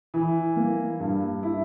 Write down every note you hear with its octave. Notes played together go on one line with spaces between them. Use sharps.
E3
A#3
G2
E4